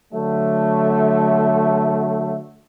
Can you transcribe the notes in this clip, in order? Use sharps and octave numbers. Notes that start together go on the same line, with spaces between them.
D3 F#3 A3